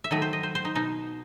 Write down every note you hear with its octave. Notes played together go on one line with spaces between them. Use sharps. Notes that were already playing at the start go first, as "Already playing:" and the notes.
E5
D#3 F#3 A3 D#5
C5
D#5
C5
C5
D#4
B2 D#4